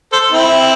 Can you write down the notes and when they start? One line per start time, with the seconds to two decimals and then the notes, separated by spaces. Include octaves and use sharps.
0.12 A4 C5
0.32 C4 E4